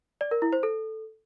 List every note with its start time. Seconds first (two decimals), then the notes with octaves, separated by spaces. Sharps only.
0.21 D5
0.31 A#4
0.42 E4
0.53 C5
0.63 A4